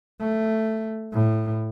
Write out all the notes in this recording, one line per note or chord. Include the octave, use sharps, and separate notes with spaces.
A3
A2